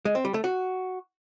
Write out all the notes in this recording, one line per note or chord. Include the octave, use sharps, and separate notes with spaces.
G#3
C4
G3
A3
F#4